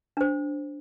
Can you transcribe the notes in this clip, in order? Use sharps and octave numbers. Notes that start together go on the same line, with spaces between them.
D4 C5